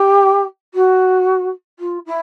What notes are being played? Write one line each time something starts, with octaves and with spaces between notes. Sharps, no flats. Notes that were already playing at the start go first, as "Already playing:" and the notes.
Already playing: G4
F#4
F4
E4